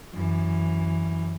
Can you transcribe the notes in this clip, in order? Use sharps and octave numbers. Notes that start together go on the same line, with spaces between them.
F#2 E3